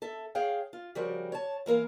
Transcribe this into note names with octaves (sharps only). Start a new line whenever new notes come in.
A4 E5
G#4 C#5 F5 G5
F4
C#3 F3 G3 F#4 A#4 G5
C#5 A5
E3 A#3 A#4 F5